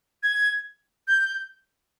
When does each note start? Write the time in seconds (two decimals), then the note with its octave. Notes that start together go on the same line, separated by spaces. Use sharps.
0.23 G#6
1.08 G6